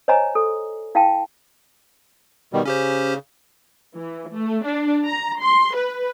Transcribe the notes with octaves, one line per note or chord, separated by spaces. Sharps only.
C5 C#5 D#5 G#5 A#5
A4
E4 F5 G5 A5
B2 D#3 G3
C#3 C#4 G4 C5
E3
A3
D4
A#5
C6
B4